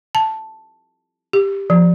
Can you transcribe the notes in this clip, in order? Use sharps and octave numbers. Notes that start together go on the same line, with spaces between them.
A5
G4
F3